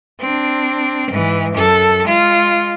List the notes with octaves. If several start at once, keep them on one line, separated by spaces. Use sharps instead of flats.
C4 D4
G#2 E3
F#2 A4
G#3 F4